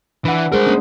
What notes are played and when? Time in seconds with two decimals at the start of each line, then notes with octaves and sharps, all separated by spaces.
0.25 E3 D4 F#5
0.52 G3 G#3 G#4 A#4 C5
0.67 A#3 C#4 D4